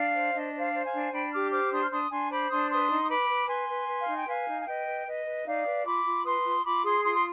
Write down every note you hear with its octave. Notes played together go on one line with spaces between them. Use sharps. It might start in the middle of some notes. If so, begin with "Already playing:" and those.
Already playing: D4 D5 F5
C5
D4 D#5
C5
D5 F5
C5
F5 G#5
D4
D4 G5 B5
G4 D6 F6
C5 D6 F6
D4 C6 D#6
F6
D4 C6 D#6
D4 G#5 C6
C5 B5 D6
D4 C6 D#6
B4 C6 D#6
D#4
D#6
B4 B5 D6
B4
B4 G#5 C6
B4
B4
F5
D#4
G5
B4 F5 G#5
D#4
G#5
B4 D#5 G5
B4
B4 D#5
B4
D#4 D5 F5
B4
F4 B5 D6
F4
B4 C6 D#6
F4
F4 B5 D6
G#4 C6 D#6
F4 C6 D#6
C6